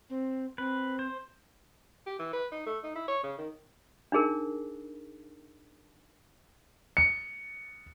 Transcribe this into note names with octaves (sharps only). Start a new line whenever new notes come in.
C4
C4 B4
C5
G4
E3
B4
D#4
A3
D#4
E4
C#5
C#3
D#3
D4 D#4 G#4 A#4
C#7